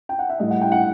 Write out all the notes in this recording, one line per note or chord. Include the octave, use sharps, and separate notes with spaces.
G5
F#5
E5
A2 G3 D#5
F#5
G5
F#5